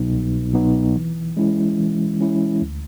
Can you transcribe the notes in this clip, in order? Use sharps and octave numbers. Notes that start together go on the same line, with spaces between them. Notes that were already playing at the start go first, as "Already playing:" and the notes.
Already playing: C2 B2 F#3 B3 D#4
C2
B2 F#3 B3 D#4
E3
G#3 C#4 E4
E3
G#3 C#4 E4
D2